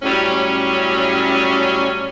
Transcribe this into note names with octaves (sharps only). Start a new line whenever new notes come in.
A2 F#3 G3 C#4